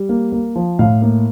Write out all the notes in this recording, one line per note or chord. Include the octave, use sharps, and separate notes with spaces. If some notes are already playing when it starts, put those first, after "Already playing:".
Already playing: G3
A#3
A#3
F3
A2 F5
A#3